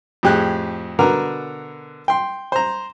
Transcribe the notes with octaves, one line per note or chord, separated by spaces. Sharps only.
F2 A2 G4 G#4 F#6
B2 D3 A#4 B4 A#5
G5 C6
C5 A#5